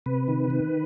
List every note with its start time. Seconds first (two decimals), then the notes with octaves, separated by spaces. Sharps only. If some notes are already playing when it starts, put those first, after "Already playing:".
0.06 C3 B4
0.28 D#3
0.50 D#3